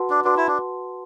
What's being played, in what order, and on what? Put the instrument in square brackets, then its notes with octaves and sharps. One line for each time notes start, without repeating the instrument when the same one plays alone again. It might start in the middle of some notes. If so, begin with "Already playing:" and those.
Already playing: [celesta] F#4 B4 F#5 A5 C6
[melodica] D4
[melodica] D4 [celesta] F#4 B4 F#5 A5 C6
[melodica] E4
D4